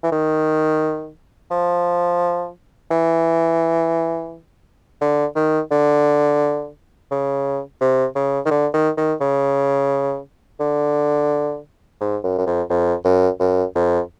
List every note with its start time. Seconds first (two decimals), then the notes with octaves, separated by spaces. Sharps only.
0.03 E3
0.12 D#3
1.51 F3
2.91 E3
5.01 D3
5.36 D#3
5.71 D3
7.11 C#3
7.81 C3
8.16 C#3
8.46 D#3
8.51 D3
8.74 D#3
8.97 D#3
9.21 C#3
10.60 D3
12.01 G#2
12.24 F#2
12.38 F#2
12.46 F2
12.70 F2
13.05 F#2
13.40 F#2
13.76 F2